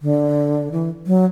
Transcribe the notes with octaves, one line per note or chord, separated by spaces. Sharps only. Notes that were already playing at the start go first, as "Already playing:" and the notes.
D3
E3
F#3